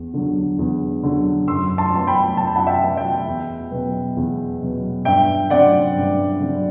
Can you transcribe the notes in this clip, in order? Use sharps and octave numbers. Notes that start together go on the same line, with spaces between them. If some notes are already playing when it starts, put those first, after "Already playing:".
Already playing: E2
D3 F#3
E2
D3 F#3
F#2 C6 E6
A5 C6
F#3 B3 C6
G5 B5
F#2 A5
B5
F#5 A5
E5 G5
F#3 B3
E5 G5
E2
B2 F#3 B3
E2
B2 F#3 B3
G2 E5 G5
D3 F#3 C4 D5 F#5
G2
D3 F#3 C4